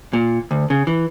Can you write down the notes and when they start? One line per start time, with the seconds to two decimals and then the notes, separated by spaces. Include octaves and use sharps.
0.13 A#2
0.51 D2
0.70 C#3
0.87 E3